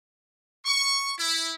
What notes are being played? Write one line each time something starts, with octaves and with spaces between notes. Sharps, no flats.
C#6
E4